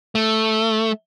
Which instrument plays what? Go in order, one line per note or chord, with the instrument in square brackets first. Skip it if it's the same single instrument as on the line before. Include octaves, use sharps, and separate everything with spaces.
[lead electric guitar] A3